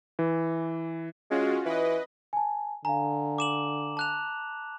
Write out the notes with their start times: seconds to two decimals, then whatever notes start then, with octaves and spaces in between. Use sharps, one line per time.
0.19 E3
1.31 G#3 C#4 F4 F#4
1.66 E3 B4 D#5
2.33 G#5 A5
2.85 D3 F5 G#5 A#5
3.38 D6 E7 F#7
3.97 A5 F#6 F7